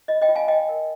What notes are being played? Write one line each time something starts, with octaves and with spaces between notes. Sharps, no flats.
F4 D#5
D#5 G5
F4
F5 G#5
F4 D#5 G5
A#4